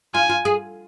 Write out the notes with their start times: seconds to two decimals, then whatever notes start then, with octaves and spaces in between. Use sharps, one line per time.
0.14 F4 G#5
0.29 F4
0.45 G#4